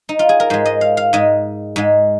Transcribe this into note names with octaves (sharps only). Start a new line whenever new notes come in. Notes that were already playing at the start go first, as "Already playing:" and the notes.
D#4
F4
G#4
A#4
G#2 G#3 C5
D#5
F5
F5
G#2 G#3 D#5
G#2 G#3